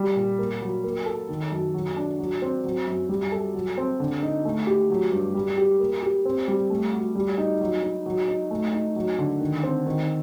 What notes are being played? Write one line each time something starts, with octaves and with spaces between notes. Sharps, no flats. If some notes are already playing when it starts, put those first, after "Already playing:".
Already playing: G3
A#2
A#3
F#3
A#3
A4
D#3
F#2
F#3
D4
F#3
C4
F#3
F#2
G3
A4
F#3
C4
D3
D#4
A3
G4
F#3
G2
G3
G4
A#3
G4
C4
G3
A3
F#4
G3
D#4
F#3
D#4
F#3
D#4
A3
D#4
F#3
D3
D#3
C4
D#3